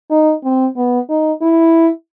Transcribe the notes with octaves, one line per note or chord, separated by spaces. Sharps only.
D#4
C4
B3
D#4
E4